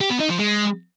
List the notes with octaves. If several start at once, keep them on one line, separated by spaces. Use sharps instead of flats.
G4
B3
D#4
F3
G#3